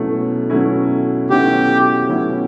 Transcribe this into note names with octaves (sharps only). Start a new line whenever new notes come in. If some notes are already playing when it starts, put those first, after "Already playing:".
Already playing: B2 F#3 A3 C#4 E4
B2 F#3 A3 C#4 E4
B2 F#3 A3 C#4 E4 G4
B2 F#3 A3 C#4 E4